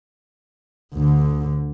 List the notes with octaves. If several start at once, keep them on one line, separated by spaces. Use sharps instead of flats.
D2 D3